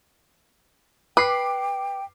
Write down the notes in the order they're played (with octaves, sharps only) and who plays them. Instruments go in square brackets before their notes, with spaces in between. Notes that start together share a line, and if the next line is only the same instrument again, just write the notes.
[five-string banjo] B4 [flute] G5 [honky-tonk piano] D6 C7